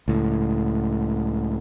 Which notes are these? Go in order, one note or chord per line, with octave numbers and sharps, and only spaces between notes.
C#2 A2